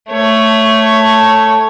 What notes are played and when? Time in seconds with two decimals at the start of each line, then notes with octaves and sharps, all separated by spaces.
0.11 A3 C#5